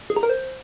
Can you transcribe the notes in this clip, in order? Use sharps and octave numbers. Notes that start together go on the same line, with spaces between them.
G#4
A#5
A#4
C5